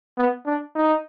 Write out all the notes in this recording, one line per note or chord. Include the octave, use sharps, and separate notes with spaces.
B3
D4
D#4